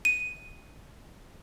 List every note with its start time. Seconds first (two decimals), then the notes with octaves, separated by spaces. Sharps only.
0.05 D#7